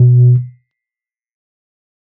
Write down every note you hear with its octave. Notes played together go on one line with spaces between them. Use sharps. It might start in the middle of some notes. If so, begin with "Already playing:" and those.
Already playing: B2